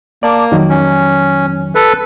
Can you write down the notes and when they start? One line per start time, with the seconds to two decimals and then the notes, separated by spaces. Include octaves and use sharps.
0.23 A#3 D5 A5 D6
0.51 F2 D#3 F#3
0.70 C#4
1.75 A4 B4